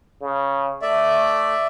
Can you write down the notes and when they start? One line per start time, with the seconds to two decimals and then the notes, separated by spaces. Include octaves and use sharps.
0.21 C#3
0.82 A3 D5 E5